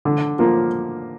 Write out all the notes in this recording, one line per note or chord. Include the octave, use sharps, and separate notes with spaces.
D3
F3 A#3